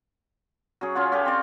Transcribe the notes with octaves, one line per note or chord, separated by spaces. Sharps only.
F#3 C#4 G#4
C#4 F4 F#5
C#4 F4 G4 A4
C4 D5